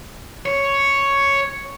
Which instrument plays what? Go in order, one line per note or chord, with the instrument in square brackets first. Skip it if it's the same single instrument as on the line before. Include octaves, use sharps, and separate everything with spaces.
[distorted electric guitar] C#5